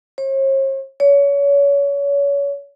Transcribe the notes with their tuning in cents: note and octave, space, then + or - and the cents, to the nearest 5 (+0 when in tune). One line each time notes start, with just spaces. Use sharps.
C#5 -45
C#5 +30